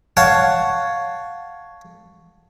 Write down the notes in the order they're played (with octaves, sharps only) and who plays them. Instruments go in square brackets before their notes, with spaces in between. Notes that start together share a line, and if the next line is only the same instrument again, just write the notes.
[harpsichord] C#5 F5 F#5 A5